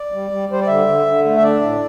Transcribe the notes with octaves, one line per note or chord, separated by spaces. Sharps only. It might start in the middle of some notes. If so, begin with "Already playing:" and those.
Already playing: D5
G3
G3
G3 C5
D5
D3 E5
D3
D3
A3
E5
D4 D5
A2